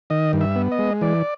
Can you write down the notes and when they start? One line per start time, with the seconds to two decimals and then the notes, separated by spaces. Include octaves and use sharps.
0.10 D#3 D#5
0.33 G2
0.41 E5
0.56 B3
0.72 D#5
0.79 G#3
1.01 E3 D5